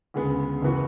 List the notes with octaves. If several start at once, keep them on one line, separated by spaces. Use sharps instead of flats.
D2 C#3 G#3 B3
F#1 E3 B3 F#4